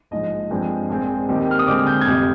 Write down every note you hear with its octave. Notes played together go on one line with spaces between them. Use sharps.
A#1 G#2 F3 D#5
G2 F3 G#3 C4
A#1 A#2 G#3 C4
D#2 D#3 G3 C4
F6
D#6
D#2 D3 G#3 C4 D6
G6
G#6
F1 F2 C3 G3 G6